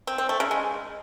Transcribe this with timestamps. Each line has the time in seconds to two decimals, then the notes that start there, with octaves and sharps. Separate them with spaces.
0.07 C4
0.18 C4
0.29 A3
0.40 C#3
0.51 G#3